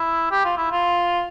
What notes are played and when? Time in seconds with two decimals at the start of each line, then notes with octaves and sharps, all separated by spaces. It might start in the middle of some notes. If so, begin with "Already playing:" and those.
Already playing: E4
0.31 G4
0.45 F4
0.57 E4
0.71 F4